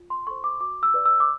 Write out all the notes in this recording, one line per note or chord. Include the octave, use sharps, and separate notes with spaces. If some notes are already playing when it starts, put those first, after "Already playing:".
Already playing: F4
C6
A4 C5 C#6
D6
F#4 D6
E6
B4 D5
E6
D6